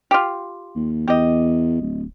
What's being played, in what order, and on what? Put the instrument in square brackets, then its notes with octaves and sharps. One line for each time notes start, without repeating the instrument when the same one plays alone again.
[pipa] F4 G4
[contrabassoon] D#2
[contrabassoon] E2 [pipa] G4 D#5
[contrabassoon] D1